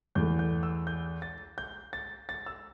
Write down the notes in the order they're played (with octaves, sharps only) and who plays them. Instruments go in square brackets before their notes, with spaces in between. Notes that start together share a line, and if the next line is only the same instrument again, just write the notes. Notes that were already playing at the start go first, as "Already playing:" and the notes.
[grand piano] E2 E3 A3 G6
G6
E6
G6
A6
G6
A6
A6
E6